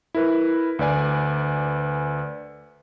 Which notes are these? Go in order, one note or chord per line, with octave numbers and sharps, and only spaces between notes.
E4 A#4 B4
D2 B4 D5 G#5